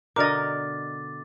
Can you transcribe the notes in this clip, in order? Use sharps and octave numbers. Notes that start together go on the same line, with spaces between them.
B2 D3 A#4 D#5 D6 A6